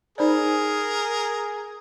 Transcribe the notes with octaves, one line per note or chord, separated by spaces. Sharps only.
D#4 G#4 A#4 C5 D5